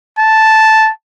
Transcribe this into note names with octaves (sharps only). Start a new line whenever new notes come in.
A5